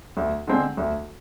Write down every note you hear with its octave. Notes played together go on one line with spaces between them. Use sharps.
D2
D3 G#3 C4
D2